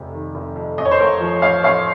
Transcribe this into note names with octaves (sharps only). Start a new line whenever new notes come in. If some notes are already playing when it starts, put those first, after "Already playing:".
Already playing: F1 F2 C3
D#3
F1
F2
A1 D#5
C#5
C5
A2 A#4 C#5
F3
A1 C#5 F5
A1 C#5 F5